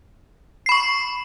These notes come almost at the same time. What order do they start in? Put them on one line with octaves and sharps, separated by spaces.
C7 B5 C#6